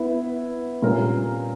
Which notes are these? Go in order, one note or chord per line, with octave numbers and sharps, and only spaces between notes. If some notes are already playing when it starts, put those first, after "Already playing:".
Already playing: B3 E4 B4 E5
A#2 G3 C#4 G4 A#4